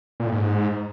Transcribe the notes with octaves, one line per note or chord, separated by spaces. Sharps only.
A#2
A2
G#2